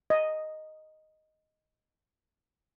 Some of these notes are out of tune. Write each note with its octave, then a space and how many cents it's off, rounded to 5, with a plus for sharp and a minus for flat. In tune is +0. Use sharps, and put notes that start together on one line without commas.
D#5 +0